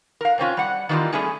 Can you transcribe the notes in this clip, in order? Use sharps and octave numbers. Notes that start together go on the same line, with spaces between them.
A#4 F5
C3 C4 C#4 F4
G3 F#5
D#3 E3 G3 A#3 F4
G3 A3 C#4 G#4